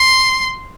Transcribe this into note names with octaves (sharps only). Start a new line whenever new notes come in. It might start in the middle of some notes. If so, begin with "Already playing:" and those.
Already playing: C6